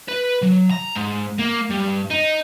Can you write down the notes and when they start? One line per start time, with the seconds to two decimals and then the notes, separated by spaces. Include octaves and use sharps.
0.08 B4
0.43 F#3
0.71 A#5
0.96 G#2
1.39 A#3
1.70 G2
2.10 D#4